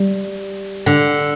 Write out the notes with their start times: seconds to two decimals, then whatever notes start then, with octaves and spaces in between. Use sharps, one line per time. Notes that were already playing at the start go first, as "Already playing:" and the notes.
Already playing: G3
0.86 D3